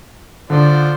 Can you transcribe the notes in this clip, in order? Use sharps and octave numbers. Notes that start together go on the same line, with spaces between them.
D3 F3 C5 D5